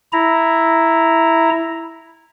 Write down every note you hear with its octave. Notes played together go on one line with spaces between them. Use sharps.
E4 A#5